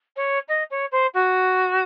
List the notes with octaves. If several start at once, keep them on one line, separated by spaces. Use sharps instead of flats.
C#5
D#5
C#5
C5
F#4